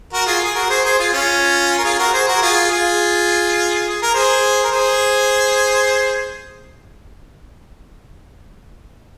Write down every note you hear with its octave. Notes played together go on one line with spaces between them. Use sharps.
F#4 A#4
F4 G#4
G#4
F#4 A#4
G#4 C5
G#4 C5
F4 G#4
C#4 F4
A#4
F4 G#4
F#4 A#4
G#4 C5
F#4 A#4
F4 G#4
F4 G#4
G#4
A#4
G#4 C5
A#4
G#4 C5